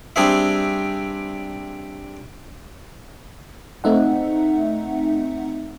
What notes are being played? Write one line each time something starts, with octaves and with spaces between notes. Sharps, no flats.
G3 C4 D4 G#4 C5 E5
A3 C4 D#4 E5 F#5